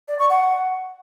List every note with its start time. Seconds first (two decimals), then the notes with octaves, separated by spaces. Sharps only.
0.08 D5
0.19 C#6
0.30 F#5